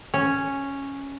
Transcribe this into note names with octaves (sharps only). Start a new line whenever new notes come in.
C#4